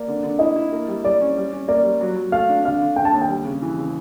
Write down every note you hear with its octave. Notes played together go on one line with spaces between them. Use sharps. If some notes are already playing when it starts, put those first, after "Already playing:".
Already playing: A#3 D5
D3
D3
E4 D#5
E4
A#3
G3
G3 D5
C#4
G3
C#4
A#3 D5
G3
F#3
F#3
A3 F5
D4
D3 F5
D3
D3 G5
A5
D#2
G5
G3
C#3
E3
C#3